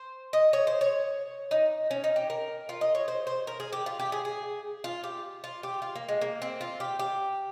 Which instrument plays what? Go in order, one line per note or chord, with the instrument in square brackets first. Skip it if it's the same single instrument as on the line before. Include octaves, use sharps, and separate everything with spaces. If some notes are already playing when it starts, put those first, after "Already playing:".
Already playing: [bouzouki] C5
D#5
C#5
C5
C#5
D#4
C#4
D#4
G4
A#4
F4
D#5
C#5
C5
C5
A#4
G#4
G4
F4
G4
G#4
G#4
F4
G4
F4
G4
F4
A#3
G#3
A#3
C4
F4
G4
G4